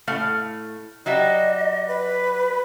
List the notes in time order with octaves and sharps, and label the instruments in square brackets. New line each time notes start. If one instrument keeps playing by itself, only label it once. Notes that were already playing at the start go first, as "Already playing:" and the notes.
[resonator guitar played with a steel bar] A2 A3 F5
[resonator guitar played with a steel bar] F#3 G3 E5 [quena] D#5
[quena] B4